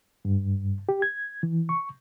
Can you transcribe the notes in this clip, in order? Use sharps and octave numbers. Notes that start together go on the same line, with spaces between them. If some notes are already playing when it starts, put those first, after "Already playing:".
G2
G4
G#6
E3
C#6